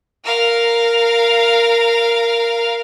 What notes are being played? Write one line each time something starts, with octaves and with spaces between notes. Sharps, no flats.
A#4 F5